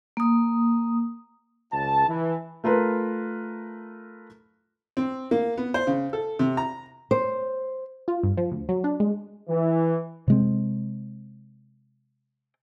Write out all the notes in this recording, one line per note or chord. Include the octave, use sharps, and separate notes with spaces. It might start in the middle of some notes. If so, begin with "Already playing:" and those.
A#3 D#6
C#2 A5
E3
A3 F4 A#4 B4
C4
A#3
B3
C5
C#3
A4
C3
A#5
C5
F4
G2
F3
D2
F#3
D4
G#3
E3
C3 G#3 C4